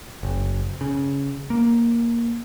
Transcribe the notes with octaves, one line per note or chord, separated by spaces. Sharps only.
F#1
C#3
A#3